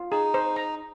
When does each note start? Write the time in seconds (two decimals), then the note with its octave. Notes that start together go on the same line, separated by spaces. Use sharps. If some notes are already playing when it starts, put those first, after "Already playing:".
Already playing: F4
0.11 D#4 G#4
0.34 C5
0.56 A#5